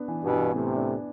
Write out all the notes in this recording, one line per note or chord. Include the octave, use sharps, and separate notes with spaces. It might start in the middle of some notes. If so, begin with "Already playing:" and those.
Already playing: B3 D4
E3
G2 B2
E3
A2 C3 B3
D4